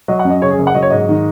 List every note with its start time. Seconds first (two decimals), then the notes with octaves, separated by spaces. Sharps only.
0.08 F#3 D#5
0.19 F#5
0.25 F#2
0.30 D#5
0.42 C#3 C#5
0.50 G#4
0.58 F#1
0.67 F#5
0.74 F#3 D#5
0.82 C#5
0.90 G#2 D#5
1.09 D#3